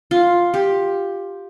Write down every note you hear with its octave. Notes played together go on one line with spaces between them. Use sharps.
F4
G4